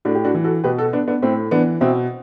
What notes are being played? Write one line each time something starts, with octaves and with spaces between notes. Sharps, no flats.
A2 D4 F#4
G4
D4 F#4
E3
F#4 A4
B2 G4 B4
F#4 A4
B3 D4
B3 D4
A2 A3 C4
E3 B3 D4
B2 C4 E4